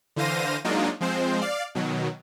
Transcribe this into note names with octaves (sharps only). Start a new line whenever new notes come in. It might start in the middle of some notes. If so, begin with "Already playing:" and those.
D3 E3 C5 F5 A#6 D#7
F#3 G#3 A#3 D4 D#4 F4
F3 G#3 C4 C5
D5 F5
B2 D#3 F#3